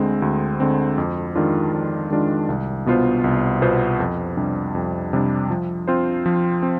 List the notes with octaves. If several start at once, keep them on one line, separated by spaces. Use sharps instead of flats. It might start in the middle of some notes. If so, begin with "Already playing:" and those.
Already playing: D2 D3 G#3 C4
D2
D3 G#3 C4
F2
D#3 G#3 D4 F4
F2
D#3 G#3 D4 F4
C2
B2 B3 F4 C5
C2
B2 B3 F4 C5
F2
C3 G3 D4
F2
C3 G3 D4
F3
C4 F4 C5
F3
C4